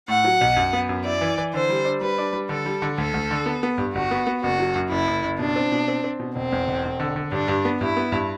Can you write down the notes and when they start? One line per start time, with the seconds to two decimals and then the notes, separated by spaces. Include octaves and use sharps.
0.08 A2 F#5
0.24 F#3
0.41 B1
0.56 F#2
0.73 B3
0.89 F#2
1.05 E4 D5
1.21 E3
1.38 E3
1.54 D3 C5
1.69 G3
1.85 D4
2.01 G3 B4
2.18 D4
2.33 G3
2.49 D3 A4
2.66 G3
2.82 D3
2.98 D2 A4
3.14 D2
3.31 D3
3.46 B3
3.63 B3
3.78 G2
3.94 G1 F#4
4.11 B3
4.27 B3
4.42 F#1 F#4
4.59 F#3
4.76 F#2
4.91 F#1 E4
5.07 F#1
5.24 F#1
5.39 B2 D4
5.56 C4
5.72 B2
5.88 C4
6.04 C4
6.20 B2
6.36 E1 C4
6.52 E2
6.68 E1
6.85 E1
7.00 D3
7.16 D3
7.32 G2 D4
7.48 G2
7.65 B3
7.81 G2 E4
7.97 B3
8.12 G2